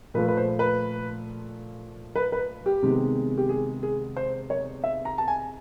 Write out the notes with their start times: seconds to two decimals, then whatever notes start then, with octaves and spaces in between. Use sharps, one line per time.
0.14 A#2 F3 A3 B4
0.28 B4
0.37 C5
0.59 B4
2.15 B4
2.32 B4
2.66 G4
2.82 C3 D#3 G#3 B3
3.38 G4
3.49 G#4
3.83 G#4
4.17 C5
4.50 C#5
4.84 E5
5.05 A#5
5.18 A5
5.28 G#5